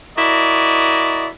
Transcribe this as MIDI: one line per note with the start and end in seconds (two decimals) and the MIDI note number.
0.18 1.28 64
0.18 1.28 66
0.18 1.28 70
0.18 1.28 74
0.18 1.28 75